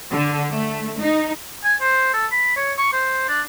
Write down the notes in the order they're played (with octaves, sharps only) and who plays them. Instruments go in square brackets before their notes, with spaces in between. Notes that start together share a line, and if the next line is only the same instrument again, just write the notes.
[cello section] D3
A3
D#4
[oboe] G#5
C5
A4
B5
C#5
C#6
C5
D4